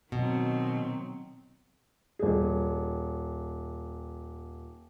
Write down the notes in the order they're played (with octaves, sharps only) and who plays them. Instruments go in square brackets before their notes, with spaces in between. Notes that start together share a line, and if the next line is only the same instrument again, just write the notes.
[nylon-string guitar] B2 [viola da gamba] D#3 F#3 C4
[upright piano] D#1 G#4